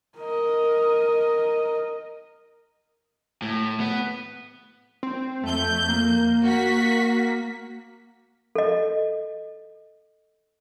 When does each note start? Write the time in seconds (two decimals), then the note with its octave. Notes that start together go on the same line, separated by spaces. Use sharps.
0.18 A#4 D#5
3.42 A2
3.80 B3
5.03 C4
5.43 F2 A3 G6
5.89 A#3
6.44 A#3 F#4 B6
8.55 A4 D#5